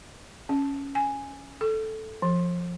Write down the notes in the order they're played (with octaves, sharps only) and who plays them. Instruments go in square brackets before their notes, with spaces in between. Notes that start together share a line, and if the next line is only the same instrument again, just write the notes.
[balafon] C#4
G#5
A4
F3